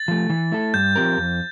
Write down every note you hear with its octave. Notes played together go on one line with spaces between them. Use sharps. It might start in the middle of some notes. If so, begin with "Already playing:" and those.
Already playing: A6
F3 A3
E3
A3 E4 A4
G2 G6
F3 C4 G4 A#4
F2